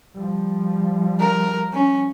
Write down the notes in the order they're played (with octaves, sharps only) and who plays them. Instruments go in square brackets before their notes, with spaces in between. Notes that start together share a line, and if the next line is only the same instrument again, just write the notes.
[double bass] F3 G3
[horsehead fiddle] A#4
C#4